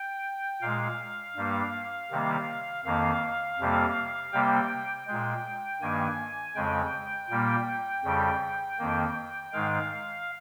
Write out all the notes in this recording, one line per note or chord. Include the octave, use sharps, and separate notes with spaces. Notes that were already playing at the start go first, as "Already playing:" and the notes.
Already playing: G5
A#2 G#3 F5
G2 G3 A#3
C3 D#3 G3 A#3
F2 D#3 A#3 F5
F2 C3 G3 A#3
C3 G3 A#3 G5
A#2 G#3 G5
G2 D#3 A#3 G#5
F2 C#3 G#3 G5
A#2 G3 A#3
F2 C#3 G3
F2 D#3 A#3
G#2 D#3 G#3 F5